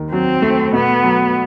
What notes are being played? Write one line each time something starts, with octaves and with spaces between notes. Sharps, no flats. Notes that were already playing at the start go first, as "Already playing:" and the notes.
Already playing: D#2 D#3
F#3 C4
A3
B2 B3
F#3